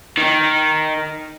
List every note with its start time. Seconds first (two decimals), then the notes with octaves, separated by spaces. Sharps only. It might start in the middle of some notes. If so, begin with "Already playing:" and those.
0.17 D#3